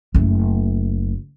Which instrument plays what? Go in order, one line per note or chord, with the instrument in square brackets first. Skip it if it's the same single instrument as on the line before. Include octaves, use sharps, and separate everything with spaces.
[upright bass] F#1 A3